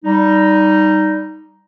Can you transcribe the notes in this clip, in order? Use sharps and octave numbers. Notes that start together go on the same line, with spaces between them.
G3 D#4